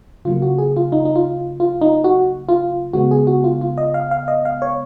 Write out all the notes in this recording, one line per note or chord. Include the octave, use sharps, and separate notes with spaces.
C#3 F#3 A#3 F4
F#4
G#4
F4
D#4
D#4
F4
F4
D#4
F#4
F4
C#3 G#3 B3 F#4
G#4
F#4
F4
F4
D#5
F5
F5
D#5
F5
C#5